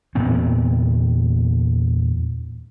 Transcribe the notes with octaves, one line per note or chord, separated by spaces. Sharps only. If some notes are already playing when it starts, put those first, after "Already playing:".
E2 A#2 B3 C4